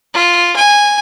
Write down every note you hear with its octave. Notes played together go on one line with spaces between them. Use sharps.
F4
G#5